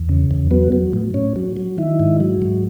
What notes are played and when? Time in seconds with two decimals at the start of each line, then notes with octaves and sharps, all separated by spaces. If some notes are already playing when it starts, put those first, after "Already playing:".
Already playing: E2
0.09 C#3
0.31 E2
0.51 F#3 B3
0.72 F#3
0.93 A2
1.14 A2 C#4
1.36 F#3
1.57 F#3
1.78 D#3 E4
1.99 G#2
2.20 F#3
2.42 G#2